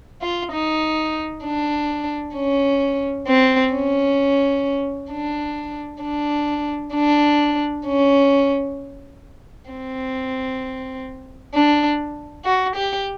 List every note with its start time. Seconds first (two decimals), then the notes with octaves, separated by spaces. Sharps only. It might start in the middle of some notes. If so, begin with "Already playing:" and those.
0.21 F4
0.52 D#4
1.44 D4
2.35 C#4
3.27 C4
3.74 C#4
5.11 D4
6.02 D4
6.94 D4
7.86 C#4
9.71 C4
11.54 D4
12.45 F#4
12.76 G4